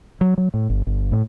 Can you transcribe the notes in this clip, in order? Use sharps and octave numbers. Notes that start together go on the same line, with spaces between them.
F#3
F#3
A2
G1
G1
A2